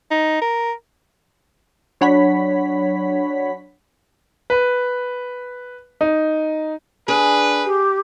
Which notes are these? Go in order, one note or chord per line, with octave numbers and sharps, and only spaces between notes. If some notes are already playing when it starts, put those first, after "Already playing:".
D#4
A#4
F#3 D4 C#5 F#5 B5 B6
B4
D#4
D4 G#4 B4
G4